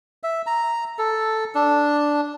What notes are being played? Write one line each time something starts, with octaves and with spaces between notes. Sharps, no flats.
E5
A#5
A4
D4